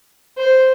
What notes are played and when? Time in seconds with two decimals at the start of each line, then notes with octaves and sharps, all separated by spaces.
0.38 C5